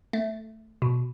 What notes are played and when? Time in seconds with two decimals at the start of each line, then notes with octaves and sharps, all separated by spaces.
0.13 A3
0.82 B2